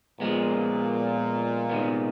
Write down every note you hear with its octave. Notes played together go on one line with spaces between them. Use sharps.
A#2 F3 G#3 B3
C3 D#3 G#3 B3